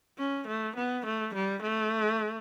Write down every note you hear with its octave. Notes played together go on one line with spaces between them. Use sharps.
C#4
A3
B3
A3
G3
A3